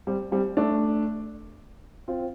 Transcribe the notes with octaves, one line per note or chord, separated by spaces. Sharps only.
G3 C4
G3 C4
A3 D4
C4 F4